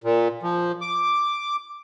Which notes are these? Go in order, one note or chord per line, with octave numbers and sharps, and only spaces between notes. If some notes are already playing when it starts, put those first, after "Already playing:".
A#2
F3
D6